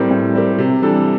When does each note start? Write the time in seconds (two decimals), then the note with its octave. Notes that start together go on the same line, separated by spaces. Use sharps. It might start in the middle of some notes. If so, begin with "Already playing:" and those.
Already playing: A2 G3 C4 G4 A#4
0.11 A2
0.33 G3 C4 G4 A#4
0.58 C3
0.82 E3 G3 D4 A4